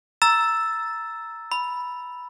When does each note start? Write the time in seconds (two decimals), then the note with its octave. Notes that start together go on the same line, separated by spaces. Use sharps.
0.22 A#5 E6 A6 E7
1.52 B5